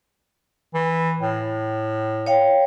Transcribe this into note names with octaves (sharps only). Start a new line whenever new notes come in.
E3
A2
C#5 F5 G5